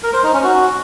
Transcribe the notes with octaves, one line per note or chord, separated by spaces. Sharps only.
A#4
C5
D#4
C#4
F#4